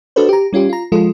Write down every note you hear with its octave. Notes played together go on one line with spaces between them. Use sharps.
D4 F#4 A4 B4 C5
G4 A#5
G3 C#4 F4 G4
F4 A#5
F3 G#3 F4 A4